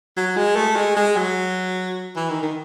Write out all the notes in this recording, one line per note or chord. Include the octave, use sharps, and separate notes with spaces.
F#3
G#3
A3
G#3
G#3
F#3
E3
D#3
D#3